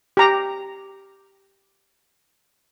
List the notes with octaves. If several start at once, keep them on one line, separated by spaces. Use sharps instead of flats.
G4 A#5